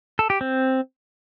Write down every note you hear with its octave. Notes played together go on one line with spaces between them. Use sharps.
A4
G4
C4